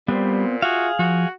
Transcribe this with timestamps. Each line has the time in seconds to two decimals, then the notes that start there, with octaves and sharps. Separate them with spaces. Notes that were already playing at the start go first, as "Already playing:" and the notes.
0.08 A#2 G3 B3 C4 C5
0.62 F4 F#4 G#4 E5 F5
0.99 F3 F#4